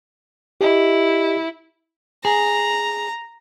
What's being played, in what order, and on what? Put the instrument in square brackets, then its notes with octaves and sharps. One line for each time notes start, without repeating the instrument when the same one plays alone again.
[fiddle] E4 [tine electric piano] G4 D#5
[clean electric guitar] G#4 [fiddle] A#5